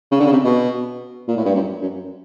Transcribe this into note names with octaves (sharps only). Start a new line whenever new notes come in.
C#3
D3
C#3
C3
B2
A#2
A2
G2
F#2
F#2